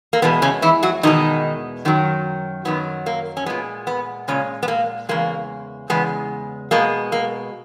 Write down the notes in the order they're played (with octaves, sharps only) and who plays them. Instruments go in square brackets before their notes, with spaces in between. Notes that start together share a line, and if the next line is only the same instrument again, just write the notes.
[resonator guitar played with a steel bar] A#3
E2 B2 G#3 B3
C#3 C#4
E3 E4
F#3 F#4
E2 B2 D#3 G#3 D#4
F#2 D#3 F#3
F#2 D#3 F#3 B3
A#3
C#4
A#2 G#3 B3
B3
A#2 C#3 G#3 C#4
B3
A#3
E2 C#3 G#3 A#3
E2 C#3 G#3 B3
B2 G#3 A#3
A#3